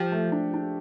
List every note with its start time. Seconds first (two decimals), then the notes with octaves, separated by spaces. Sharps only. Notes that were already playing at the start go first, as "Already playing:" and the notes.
Already playing: F3 G4
0.12 A3
0.32 D4
0.54 D4